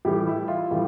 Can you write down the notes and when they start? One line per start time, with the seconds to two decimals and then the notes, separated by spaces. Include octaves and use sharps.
0.05 A2 E3 G3 G4
0.27 E4
0.48 F4
0.71 A2 E3 G3